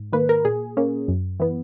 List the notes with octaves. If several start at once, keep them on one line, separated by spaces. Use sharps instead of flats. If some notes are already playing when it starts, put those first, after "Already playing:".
Already playing: G#2
D#3 A#3 B4
A#4
A#2 G#4
A#3 C#4
F#2
E3 B3